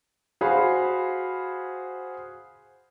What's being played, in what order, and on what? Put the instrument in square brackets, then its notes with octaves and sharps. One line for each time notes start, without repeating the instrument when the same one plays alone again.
[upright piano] F#4 G#4 C5 F5 B5